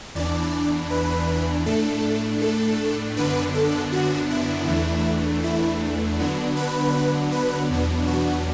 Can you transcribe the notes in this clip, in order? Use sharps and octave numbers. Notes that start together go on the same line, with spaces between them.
E2 E3 D4 D5
B4
A2 A3 D4 A4
A4
F#2 D3 B3 D4 B4
A4
F#4
E4
E2 E3 A3 D4
E4
D3 F#3 B3 D4
B4
B4
E2 B2 F#3 B3 D4
F#4